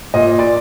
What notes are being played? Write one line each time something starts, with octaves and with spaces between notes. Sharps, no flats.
A#2 D#5
D5